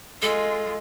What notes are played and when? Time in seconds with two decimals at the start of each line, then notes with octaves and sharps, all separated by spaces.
0.22 G#3 F4 A4